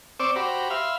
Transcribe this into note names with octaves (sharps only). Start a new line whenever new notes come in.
C4 C5 D5 C#6 D6 E6
F#4 G4 C5 A#5 B5
E5 F5 B5 C6 F6